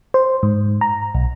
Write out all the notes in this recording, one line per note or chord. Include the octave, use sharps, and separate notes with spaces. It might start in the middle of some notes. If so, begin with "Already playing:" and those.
C5
G#2
A#5
B1